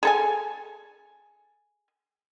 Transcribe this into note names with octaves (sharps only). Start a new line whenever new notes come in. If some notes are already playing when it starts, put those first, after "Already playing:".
G#4 A4 G#5